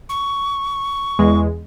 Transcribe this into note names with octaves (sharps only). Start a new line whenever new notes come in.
C#6
E2 G#3